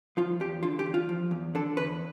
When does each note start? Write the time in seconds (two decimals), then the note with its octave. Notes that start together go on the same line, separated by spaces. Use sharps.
0.17 F3 F4
0.40 E2 G4
0.63 D3 F4
0.79 G4
0.86 E2
0.94 F4
1.09 F3
1.31 E2
1.55 D3 A4
1.77 E2 B4